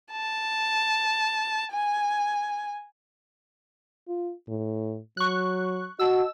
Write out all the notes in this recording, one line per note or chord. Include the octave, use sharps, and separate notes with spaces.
A5
G#5
F4
A2
F#3 C#6 F#6
F#4 D#5 A5 E6